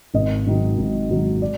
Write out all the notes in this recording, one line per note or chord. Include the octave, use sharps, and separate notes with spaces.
G#1 D#5
G#2 D#3 F#3
G#1
G#2 D#3 F#3
D5